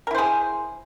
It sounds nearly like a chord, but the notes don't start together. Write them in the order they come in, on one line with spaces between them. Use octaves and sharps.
A#4 E4 C5 G#4